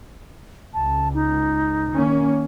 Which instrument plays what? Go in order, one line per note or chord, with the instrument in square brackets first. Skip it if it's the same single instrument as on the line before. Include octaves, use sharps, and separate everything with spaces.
[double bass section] C#2 [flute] A5
[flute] D#4
[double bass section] D#3 A#3 C#4